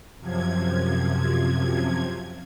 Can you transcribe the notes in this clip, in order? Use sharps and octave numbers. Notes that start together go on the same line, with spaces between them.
F#2 C3 F3 G#6